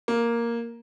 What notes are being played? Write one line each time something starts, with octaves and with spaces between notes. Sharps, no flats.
A#3